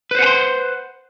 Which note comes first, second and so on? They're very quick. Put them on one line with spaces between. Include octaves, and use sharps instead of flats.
B4 C5 F#5 G#5 C6